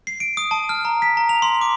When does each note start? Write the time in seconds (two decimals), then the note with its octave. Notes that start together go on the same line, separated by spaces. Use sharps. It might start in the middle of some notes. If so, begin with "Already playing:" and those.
0.07 C7
0.20 D7
0.37 D#6
0.51 A5
0.69 F6
0.85 A#5
1.02 B6
1.17 A#5
1.29 F7
1.42 C6
1.61 D6